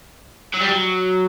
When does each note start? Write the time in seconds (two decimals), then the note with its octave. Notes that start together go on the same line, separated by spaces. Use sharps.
0.54 F#3
0.61 G3
0.69 F#3